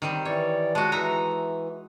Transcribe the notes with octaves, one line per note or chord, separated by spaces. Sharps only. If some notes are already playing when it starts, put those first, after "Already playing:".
D#3 G3 C4
E3 C#5 D5
G#3 F#4 A5
E3 D#4 E5 A#5